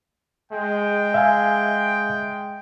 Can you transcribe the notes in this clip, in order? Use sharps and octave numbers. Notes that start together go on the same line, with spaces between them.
G#3 G5
E5 F5 G#5